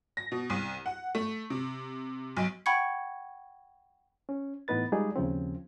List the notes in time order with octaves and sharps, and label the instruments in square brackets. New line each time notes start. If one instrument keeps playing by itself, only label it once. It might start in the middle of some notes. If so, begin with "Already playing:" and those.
[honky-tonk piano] A#6
B2
C2
F#5
A3
C3
B1
[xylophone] F#5 G5 B5 C#6 G#6 C#7
[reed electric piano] C#4
A2 E3 B3 D#4 B4 A6
G3 G#3 D#4 F4 G#4 D5
D#2 C#3 F3 C4